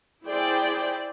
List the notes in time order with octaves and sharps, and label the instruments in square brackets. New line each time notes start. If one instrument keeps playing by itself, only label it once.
[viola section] E4 G#4 C5 D5 G5